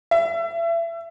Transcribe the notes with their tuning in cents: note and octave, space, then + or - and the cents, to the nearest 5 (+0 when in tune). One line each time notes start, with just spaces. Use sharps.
E5 +30